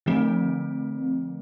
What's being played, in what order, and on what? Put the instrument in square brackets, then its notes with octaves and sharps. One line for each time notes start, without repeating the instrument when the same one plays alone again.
[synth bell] D3 F3 A3 C4